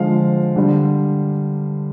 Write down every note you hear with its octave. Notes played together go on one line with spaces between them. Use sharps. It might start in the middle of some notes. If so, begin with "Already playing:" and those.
Already playing: D3 F3 G#3 F5
D3 G3